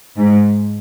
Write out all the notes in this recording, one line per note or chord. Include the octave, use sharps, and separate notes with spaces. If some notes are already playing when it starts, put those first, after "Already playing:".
G#2